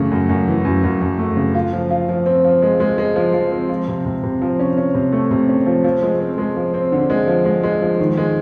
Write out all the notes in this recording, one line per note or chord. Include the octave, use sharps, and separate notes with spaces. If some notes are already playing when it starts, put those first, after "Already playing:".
Already playing: F#2 C#3 E3 A3
F#2
F#2
E3
F#2
F#2
F#2
A3
C#3
F4
F3
F4
F3
C4
F3
G#3
G#3
G#3
F3
F3
C4
F3
C3
C3
C3
F3
C#4
C#4
C3
A3
C3
C#4
F3
F3
G#3
C4
G#3
F3
C4
D3
G#3
F3
G#3
G#3
F3
D#3
G#3